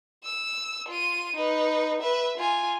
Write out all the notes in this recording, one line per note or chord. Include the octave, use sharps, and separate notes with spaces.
E6
F4 D#7
D#4 B4
B4 E5
F4 G#5